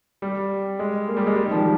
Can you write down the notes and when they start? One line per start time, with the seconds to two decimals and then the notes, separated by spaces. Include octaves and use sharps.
0.22 G3
0.79 G#3
1.08 A#3
1.17 G3
1.27 G#3
1.36 G3
1.46 D#3
1.51 F3